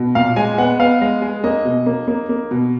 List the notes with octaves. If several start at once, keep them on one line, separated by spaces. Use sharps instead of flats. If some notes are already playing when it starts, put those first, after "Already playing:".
Already playing: B2
A#2 F5
G#3 G#5
B3 F#5
B3 F5
G#3
G#3
A#3 D#5
B2
A#3
A#3
A#3
B2